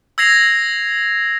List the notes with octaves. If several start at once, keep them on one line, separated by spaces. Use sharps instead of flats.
E6 G#6 A#6 C7 F7